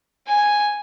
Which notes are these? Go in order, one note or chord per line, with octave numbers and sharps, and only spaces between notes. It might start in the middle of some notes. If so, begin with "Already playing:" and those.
G#5